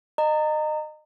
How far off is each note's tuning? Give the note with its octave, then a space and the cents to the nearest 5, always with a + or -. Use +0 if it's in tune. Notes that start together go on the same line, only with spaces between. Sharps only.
D#5 -25 A#5 -25